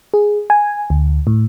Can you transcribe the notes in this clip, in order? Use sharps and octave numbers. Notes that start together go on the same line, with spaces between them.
G#4
G#5
D2
A2